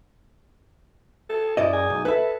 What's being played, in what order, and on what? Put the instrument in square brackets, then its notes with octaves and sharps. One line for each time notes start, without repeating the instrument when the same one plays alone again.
[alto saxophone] A4
[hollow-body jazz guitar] F#2 D5 D#5 [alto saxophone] E4
[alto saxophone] G#4
[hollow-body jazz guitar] B1
[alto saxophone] A4 [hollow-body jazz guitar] B4 E5